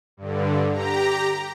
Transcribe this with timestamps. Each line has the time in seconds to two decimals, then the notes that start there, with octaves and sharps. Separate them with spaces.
0.17 G2 D3
0.72 G4 A#5